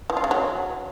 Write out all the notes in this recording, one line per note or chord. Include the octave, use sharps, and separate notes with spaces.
E3
F4
C#3
F#3